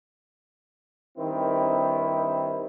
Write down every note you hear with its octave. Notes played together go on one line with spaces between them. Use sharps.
G2 D#3 C4 E4